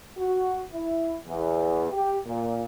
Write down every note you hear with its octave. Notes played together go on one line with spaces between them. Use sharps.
F#4
E4
E2
G4
A#2